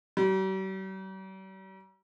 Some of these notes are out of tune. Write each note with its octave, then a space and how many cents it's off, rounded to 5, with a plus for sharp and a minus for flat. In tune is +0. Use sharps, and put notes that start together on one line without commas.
G3 -45